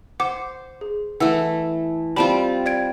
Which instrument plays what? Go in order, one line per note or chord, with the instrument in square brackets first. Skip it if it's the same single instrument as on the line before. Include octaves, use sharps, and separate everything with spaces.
[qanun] C5 [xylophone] F#5 D6
[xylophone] G#4
[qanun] E3 A3 [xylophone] F#5 E6
[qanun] G3 C4 F4 [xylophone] A5 B5
[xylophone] D5 G#6 D7